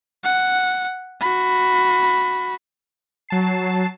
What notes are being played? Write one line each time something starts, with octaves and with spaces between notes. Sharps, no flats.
F#5
F#4 B5
F#3 A5 C7